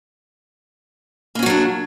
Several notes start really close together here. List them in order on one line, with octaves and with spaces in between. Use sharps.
A#3 C#4 F#4 F#3 D4